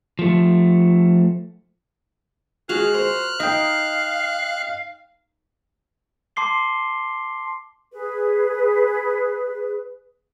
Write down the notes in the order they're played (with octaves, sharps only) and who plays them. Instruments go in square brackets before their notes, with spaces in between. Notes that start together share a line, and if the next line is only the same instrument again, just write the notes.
[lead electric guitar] F3 A3
[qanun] G#3 F#4 F5 [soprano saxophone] G#4 [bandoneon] F6 F#6
[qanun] A#4 [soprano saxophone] C5
[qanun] D#4 [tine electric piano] D#5 G5 [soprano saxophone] F5
[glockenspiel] A5 C6 D6 C7 G7
[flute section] G#4 B4